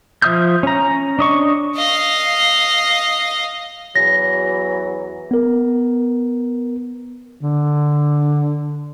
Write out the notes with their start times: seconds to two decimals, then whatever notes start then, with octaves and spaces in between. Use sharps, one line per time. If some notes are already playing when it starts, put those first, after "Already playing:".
0.22 F3 E5 D#6 F6 G6
0.63 C#4 A#5
1.19 D4 D#5 C#6
1.76 D#5 F5
3.96 E2 E3 F#3 A#6
5.31 B3 A#4
7.43 D3